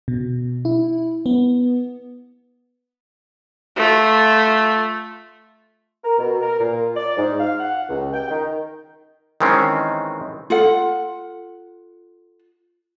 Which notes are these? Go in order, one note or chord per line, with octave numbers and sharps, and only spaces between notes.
B2
E4
B3
A3 F4
A#4
B2
A#4
A#2
D5
G#2
F5
F#5
C#2
G5
D#3
D#3 E3 G#3 C4 C#4
F4 A4 F#5